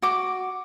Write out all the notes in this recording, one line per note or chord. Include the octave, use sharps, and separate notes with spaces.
F#4 D6